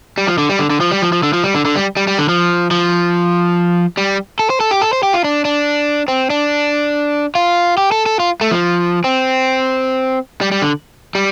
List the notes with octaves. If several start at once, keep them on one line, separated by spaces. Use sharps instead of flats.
G3
F3
D3
G3
D3
D3
F3
G3
F3
F3
D3
F3
G3
D3
D3
G3
G3
G3
D3
F3
F3
G3
A4
C5
A4
G4
A4
C5
G4
F4
D4
D4
C4
D4
F4
G4
A4
A4
F4
A3
F3
C4
G3
G3
D3
G3